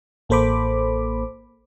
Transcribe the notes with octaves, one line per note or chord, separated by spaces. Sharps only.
A1 A#3 A4 C5 B5 D6